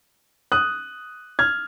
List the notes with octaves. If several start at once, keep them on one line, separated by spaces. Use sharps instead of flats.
D#6 F#6
F6 G#6